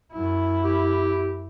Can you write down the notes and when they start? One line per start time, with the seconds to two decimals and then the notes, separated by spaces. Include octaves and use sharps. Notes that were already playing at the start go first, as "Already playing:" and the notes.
0.13 F#2 E4
0.64 G4